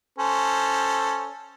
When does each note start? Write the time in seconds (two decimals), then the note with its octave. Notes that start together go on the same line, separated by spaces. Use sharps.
0.19 C#4 A4 C5